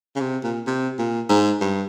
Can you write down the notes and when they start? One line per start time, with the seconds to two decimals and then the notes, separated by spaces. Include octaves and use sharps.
0.16 C#3
0.21 C3
0.44 A#2
0.67 C3
0.99 A#2
1.29 G#2
1.61 G2